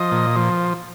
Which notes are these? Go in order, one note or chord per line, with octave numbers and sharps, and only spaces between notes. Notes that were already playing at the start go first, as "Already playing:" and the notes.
Already playing: F3 D#5
A#2
F3